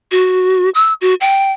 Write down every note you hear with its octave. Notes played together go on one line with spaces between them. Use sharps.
F#4
E6
F#4
G5